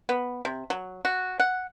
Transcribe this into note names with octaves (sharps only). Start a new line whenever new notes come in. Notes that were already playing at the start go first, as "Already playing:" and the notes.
B3
C3
F#3
F#4
F#5